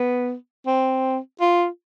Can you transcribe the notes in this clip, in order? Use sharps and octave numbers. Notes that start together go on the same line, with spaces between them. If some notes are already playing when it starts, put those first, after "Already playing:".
Already playing: B3
C4
F4